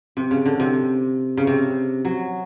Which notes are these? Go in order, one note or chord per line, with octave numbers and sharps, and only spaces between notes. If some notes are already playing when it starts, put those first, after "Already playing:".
C3
C#3
D3
C3
C#3
C3
F#3